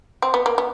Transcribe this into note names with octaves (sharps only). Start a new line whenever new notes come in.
C4
B3
A#3
B3